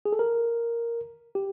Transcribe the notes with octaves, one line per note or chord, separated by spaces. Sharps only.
G#4
A4
A#4
G4